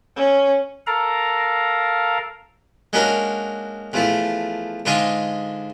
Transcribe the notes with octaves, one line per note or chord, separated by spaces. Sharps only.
C#4
A4 A#4 F5 A#5
G#3 A#3 C#4 D4 F#4 A#4
E2 F3 A3
G#2 D3 F4 G#4 D#5 C6